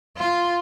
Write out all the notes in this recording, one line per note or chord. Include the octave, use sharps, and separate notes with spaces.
F4